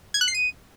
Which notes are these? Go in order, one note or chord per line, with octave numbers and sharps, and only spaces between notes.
G#6
F#6
C7
D#7